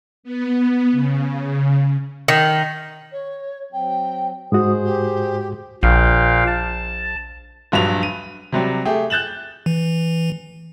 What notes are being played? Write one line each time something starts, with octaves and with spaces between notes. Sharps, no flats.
B3
C#3
D#3
C#5
F#3 C4 G5
G#2 G#3 F#4 G#4 C5 D#6
G4
A#1 A#2 F5 G5
A5
A#1 G2 F#3 F7
D#7
C3 F#3 G3
A3 G4 G#4
F#6 G6 A6 E7 F#7
E3